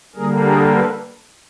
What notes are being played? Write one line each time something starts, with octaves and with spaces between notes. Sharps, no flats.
D3 G3 A#3 G#4 A#4
G#4 A#4
A4 B4